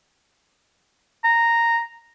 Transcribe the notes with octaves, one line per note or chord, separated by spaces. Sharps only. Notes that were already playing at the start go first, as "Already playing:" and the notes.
A#5